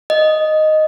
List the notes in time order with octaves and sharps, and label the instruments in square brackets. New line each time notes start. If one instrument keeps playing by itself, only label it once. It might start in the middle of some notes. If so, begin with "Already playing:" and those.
[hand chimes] D#5